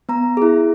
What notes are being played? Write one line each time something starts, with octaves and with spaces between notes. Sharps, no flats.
B3 A#5
E4 G#4